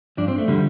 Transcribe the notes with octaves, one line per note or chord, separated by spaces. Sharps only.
G2 F3 D4
C4
A3
D3 F3 G3